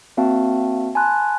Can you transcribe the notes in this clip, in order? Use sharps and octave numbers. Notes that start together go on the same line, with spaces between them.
A#3 C4 F#4 E5 F5 A5
G#5 A5 B5 C6 F#6